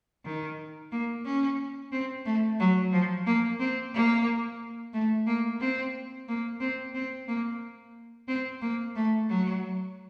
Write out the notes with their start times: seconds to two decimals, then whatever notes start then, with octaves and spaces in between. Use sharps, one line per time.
0.25 D#3
0.92 A#3
1.25 C#4
1.92 C4
2.26 A3
2.60 F#3
2.92 F3
3.26 A#3
3.60 C4
3.94 A#3
4.93 A3
5.27 A#3
5.61 C4
6.28 A#3
6.61 C4
6.94 C4
7.28 A#3
8.28 C4
8.62 A#3
8.96 A3
9.30 F#3